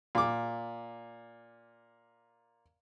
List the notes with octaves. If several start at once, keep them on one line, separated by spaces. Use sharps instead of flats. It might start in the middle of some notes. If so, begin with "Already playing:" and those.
A#2 D6